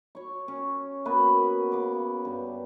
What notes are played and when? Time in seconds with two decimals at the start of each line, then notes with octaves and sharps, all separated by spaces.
0.15 C#5 C#6
0.48 C#4
1.05 A#3 B3 F#4 B4
1.72 C#3 D6
2.25 G2